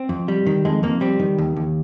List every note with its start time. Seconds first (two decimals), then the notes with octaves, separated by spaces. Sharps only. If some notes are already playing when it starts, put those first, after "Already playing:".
Already playing: C4
0.09 F2
0.28 G3
0.47 D#3
0.65 F2 G#3
0.83 F2 A#3
1.01 G3 C4
1.19 D#3
1.38 D#2
1.56 D#2